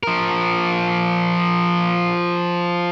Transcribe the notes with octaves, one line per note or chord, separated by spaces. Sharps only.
F3 A#4